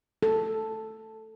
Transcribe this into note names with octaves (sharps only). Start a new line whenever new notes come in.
A4